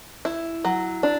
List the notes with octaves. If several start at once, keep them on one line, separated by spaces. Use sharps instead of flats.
E4
F#3
D4